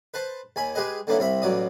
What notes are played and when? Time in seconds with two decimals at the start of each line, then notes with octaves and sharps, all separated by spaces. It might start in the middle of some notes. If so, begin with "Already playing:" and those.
0.14 B4 C5 A5
0.56 D#2 G#5 B5
0.75 G#3 G4 G#4 B4 D#5
1.07 D3 A#3 B3 C#4 E4
1.19 C2 C4 E5 B5
1.42 A1 B2 F#3 D5 D#6